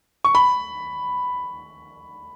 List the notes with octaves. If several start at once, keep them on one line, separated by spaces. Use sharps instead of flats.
C#6
B5